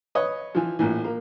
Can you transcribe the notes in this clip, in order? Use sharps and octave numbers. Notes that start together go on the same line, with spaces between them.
B4 C#5 D#5
E3 F3
A#1 A2 E3
A#3